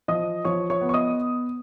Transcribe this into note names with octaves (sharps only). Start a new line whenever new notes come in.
F3 D#5 D#6
F3 C#5 C#6
C#5 C#6
B3
C#6
D#5 D#6